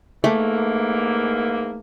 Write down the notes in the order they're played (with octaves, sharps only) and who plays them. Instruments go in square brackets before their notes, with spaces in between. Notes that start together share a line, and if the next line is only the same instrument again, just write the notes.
[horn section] G#2 E3 A#3 [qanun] A3